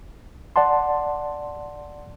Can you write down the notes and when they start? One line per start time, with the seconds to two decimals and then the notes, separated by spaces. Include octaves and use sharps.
0.56 D5 F#5 A5 C6